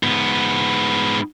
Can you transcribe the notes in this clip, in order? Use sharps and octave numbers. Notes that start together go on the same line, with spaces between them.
G#2 B3